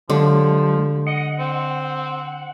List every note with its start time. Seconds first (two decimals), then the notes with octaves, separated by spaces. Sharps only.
0.10 D3 F3 F#3 G#3 G4
1.07 D#5 F#5
1.39 C4